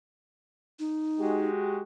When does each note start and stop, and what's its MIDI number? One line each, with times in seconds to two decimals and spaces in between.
0.79 1.49 63
1.20 1.83 56
1.20 1.83 66
1.20 1.83 67